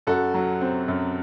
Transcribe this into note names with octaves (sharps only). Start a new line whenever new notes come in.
F#2 F#4 A4
F#3
C4
F#2